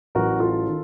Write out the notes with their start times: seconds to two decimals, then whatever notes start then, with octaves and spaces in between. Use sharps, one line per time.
0.15 A1 A2 F#3 F#4 A#4
0.40 F4 A4
0.67 D#3